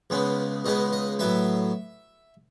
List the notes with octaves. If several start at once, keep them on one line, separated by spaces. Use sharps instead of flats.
C#2 C#3 G#3 B3
C#2 C#3 G#3 B3 D#5
D#5
A2 F#3 B3 E5